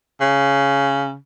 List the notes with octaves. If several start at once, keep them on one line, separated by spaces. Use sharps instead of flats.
C#3